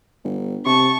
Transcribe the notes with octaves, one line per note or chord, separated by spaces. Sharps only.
G1
C3 A5 C#6